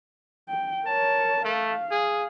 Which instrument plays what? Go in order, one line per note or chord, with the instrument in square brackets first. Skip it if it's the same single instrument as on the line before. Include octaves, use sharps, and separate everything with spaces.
[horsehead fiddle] G5
[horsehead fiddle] A#4 C#5 [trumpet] A5
[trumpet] A3 [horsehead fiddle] F5
[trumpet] G#4